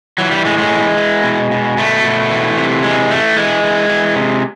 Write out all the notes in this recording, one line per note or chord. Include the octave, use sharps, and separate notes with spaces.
E3 F#3
G3
A2 G#3
G#3
E3
E3
B2
B2
B2 A3
B2
E3
C3
E3 G#3
E3 A3
E3 G#3
E3
E3
C3